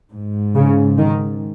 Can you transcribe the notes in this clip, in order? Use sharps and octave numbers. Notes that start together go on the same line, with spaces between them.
G#2
C#3
D#3